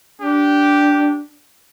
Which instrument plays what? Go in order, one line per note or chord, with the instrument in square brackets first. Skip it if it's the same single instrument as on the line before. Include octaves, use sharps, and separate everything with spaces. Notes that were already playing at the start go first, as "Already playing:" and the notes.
[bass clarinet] D4 [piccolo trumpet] G4